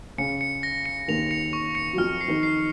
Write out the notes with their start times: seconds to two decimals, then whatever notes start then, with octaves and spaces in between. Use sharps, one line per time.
0.18 C#3 C#7
0.41 C#7
0.63 A#6
0.86 C#7
1.08 D#2 D#3 F7
1.31 C#7
1.53 C#6
1.75 C#7
1.93 F#3
1.98 F2 F3 F6
2.21 C7
2.28 D#3 D#4
2.43 C7